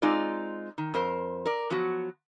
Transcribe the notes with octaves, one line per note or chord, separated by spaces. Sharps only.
G#3 C4 D#4 F4 D5
D#3
F2 A#4 C5
A#4 D5
F3 F#3 B3 F#4